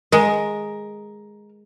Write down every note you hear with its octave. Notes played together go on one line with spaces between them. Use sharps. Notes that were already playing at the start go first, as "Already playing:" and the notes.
G#3 A#4